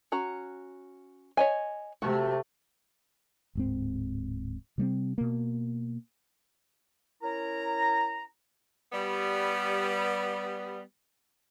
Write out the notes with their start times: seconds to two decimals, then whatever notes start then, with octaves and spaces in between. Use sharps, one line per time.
0.12 C#4 F#4 A#5
1.37 C#5 D#5 G#5
2.02 C3 A3 F#4
3.55 D1 G#2 C4
4.78 C3 G3 A3 C4
5.18 B2 A#3
7.23 C#4 E4 A#4 A#5
8.93 G3 B3